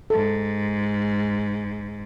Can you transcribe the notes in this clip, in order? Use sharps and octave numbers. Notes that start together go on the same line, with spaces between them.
G#2 A4